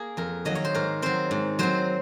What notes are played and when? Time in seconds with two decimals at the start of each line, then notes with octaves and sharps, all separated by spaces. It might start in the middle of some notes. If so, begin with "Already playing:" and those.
Already playing: A#3 G#4
0.17 F2 A#4
0.45 D#3 F#3 A#3 D#5
0.55 C#5
0.65 C5
0.74 G#2 A#4
1.02 F#3 C4 C5
1.31 G#2
1.59 F#3 C4 C5